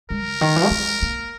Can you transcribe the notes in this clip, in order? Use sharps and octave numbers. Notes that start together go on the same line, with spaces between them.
G#3 A#4
C#3
D#3
E3
A#3
G#3
A#3